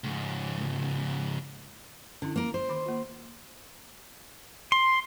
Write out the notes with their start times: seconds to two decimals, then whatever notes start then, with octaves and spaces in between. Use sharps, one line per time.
0.04 C#2 G#2
2.22 D3 C#4 E4
2.36 A#3 A#4
2.54 C5
2.69 D#3 B5 D6
2.86 A#3 F4
4.72 C6